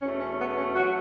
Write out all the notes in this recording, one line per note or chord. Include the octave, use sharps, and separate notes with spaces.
E2 B2 A3 C#4
C#4
B3
C#4
F#4
F#3 A3